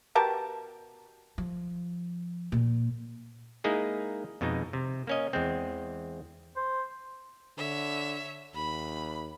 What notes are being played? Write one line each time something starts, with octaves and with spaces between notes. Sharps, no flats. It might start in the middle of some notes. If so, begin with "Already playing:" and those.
B2 G4 A#4 A5
F3
A#2
G#3 A#3 D#4 E4 G#4
F2 B2 G#3 D#4
C3
A#3 C#4 D#5
E2 G#3 C4
C5
D3 C#5 E5
D#2 B5